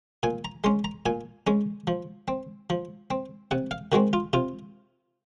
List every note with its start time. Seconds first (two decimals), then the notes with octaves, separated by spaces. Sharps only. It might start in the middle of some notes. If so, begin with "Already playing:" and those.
0.23 A#2 G#5
0.45 A#5
0.64 G#3 C#4 C6
0.84 A#5
1.06 A#2 G#5
1.47 G#3 C#4
1.87 F3
2.28 C4
2.70 F3
3.11 C4
3.51 C3 F#5
3.71 F5
3.92 D#3 G#3 C4 F#4
4.13 F4
4.33 C3 F4